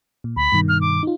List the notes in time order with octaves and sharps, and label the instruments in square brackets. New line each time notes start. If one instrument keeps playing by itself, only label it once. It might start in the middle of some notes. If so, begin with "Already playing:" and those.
[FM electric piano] A#2
[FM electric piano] D2 [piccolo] B5
[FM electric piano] G2 B2 D#3
[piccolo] F6
D6
[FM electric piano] D#4 F4